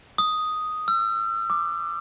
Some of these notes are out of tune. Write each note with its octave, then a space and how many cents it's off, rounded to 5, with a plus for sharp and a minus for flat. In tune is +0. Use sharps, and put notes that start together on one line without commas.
D#6 +0
E6 +45
D6 +15